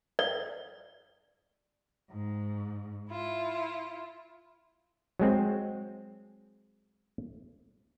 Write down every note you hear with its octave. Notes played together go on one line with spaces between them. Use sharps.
D5
G#2
E4 F4
F#3 G#3 C4